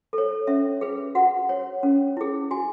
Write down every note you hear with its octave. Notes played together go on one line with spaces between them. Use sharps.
A4
C#5
C#4 E5
G#4 B4
F#4 F#5
C#5
C#4
E4 G#4
F#4 G#5